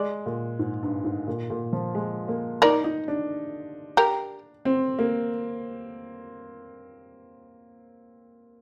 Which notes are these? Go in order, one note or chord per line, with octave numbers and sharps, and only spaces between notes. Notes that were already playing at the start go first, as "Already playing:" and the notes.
Already playing: G#3 D5
A#2
G#2
G2
G#2
A#2
A#2
F3
G#3
A#3
D#4 A#4 D5
D#4
D4
G4 A#4
C4
A#3